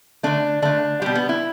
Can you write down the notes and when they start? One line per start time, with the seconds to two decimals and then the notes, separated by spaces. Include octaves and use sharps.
0.23 D3 A3 D4
0.62 D3 A3 D4
1.02 B2 G3 G4
1.15 B3
1.29 E4